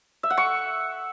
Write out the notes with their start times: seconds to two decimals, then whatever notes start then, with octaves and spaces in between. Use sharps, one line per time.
0.23 E5
0.30 F#5
0.37 C#6